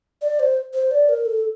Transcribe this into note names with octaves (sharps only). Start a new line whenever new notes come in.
D5
C5
C5
D5
A#4
A4